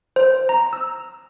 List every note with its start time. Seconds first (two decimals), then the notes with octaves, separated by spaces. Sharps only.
0.16 C5
0.49 A#5
0.73 E6